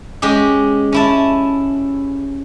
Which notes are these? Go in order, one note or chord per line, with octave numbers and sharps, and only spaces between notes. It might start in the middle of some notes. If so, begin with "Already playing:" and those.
G#3 C#4 G4 G#4
C#4 E4 A5